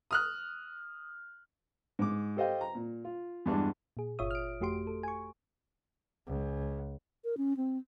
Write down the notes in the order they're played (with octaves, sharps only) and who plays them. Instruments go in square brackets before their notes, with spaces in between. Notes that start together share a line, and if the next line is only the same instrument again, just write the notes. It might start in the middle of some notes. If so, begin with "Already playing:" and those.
[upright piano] D#6 F6 F#6
[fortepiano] G#2 D6
G4 A4 C5 D#5 F5 G5
A#5
A#2
F4
E2 G2 G#3 D4
[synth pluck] A#2 G#4
G1 F4 C#5 E5 D#6
F6 D7
F2 A3 F#4 G4 C6 D7
A4
G#5 C#6
[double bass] C#2
[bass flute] A#4
C#4
C4